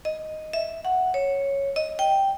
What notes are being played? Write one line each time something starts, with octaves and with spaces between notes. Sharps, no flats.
D#5
E5
F#5
C#5
D#5
G5